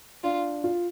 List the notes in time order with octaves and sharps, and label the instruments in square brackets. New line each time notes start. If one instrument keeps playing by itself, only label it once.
[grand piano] D4 [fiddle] F4
[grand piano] F4